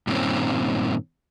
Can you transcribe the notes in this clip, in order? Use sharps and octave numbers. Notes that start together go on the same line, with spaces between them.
G2 A#2 D#3 C4 C#4